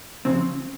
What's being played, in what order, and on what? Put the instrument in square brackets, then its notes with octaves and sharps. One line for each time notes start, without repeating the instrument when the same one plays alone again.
[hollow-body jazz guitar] C#3 F3 C4